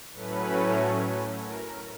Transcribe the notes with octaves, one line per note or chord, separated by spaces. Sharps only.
A2 F#3 A3 C#4 B4
A#4